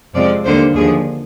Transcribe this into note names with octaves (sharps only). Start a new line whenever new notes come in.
F2 C3 F3 G#3 C4 D5
D#2 D3 G3 A#3 C5
D#2 D3 F3 G#4